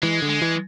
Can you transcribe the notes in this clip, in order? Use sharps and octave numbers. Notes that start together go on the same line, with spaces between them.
E3 G#3
D3
G#3
E3